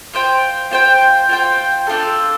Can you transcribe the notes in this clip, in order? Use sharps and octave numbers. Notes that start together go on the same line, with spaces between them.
F4 C5 G5
F4 C5 G5
F4 C5 G5
D4 F4 A4